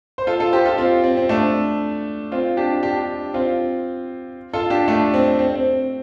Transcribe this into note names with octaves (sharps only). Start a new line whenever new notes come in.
C5
F4 A4
F4 A4
G4 C5
F4 A4
C4 F4
C4
C4
A3 D4
C4 F4
D4 G4
D4 G4
C4 F4
F4 A4
D4 G4
A3 D4
C4
C4
C4